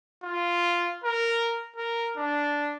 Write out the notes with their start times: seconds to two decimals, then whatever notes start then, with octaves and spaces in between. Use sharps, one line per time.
0.23 F4
1.04 A#4
1.76 A#4
2.17 D4